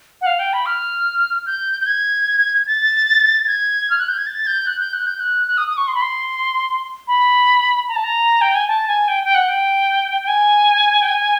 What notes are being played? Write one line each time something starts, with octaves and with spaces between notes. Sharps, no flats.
F#5
F5
G5
B5
F6
G6
G6
G#6
A6
G#6
F6
F#6
G6
G#6
A6
G6
F#6
G6
F#6
G6
F#6
F#6
D#6
D#6
C#6
C6
B5
C6
B5
A#5
A5
A#5
G5
G#5
A5
G#5
G5
G5
F#5
G5
G5
G#5
G5
G#5